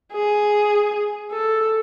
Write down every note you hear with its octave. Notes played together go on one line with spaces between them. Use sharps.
G#4
A4